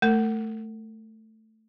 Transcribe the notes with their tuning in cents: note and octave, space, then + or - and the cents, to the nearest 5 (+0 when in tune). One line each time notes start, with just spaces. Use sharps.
A3 +0 A#4 -40